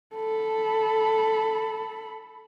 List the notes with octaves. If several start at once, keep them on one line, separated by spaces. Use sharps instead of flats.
A4 B5